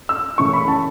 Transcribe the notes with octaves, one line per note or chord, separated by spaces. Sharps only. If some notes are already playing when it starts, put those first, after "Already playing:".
E6
F#2 C#3 E3 A3 C#4 C#6
B5
A5